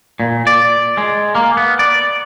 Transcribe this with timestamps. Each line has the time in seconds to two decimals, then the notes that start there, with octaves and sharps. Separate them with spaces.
0.20 A#2
0.47 D5
0.97 G#3
1.35 A#3
1.57 B3
1.79 D5